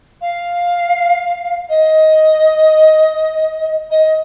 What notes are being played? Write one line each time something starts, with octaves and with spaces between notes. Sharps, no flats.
F5
D#5
D#5